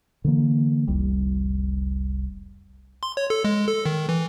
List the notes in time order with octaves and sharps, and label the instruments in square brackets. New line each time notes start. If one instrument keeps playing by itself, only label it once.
[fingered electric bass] D3 E3 A#3
F1 C2 G3
[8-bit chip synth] C6
C#5
A4
G#3
A4
D#3
E3